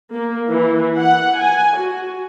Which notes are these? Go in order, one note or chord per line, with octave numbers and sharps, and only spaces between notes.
A#3
E3
F#5
G#5
F#4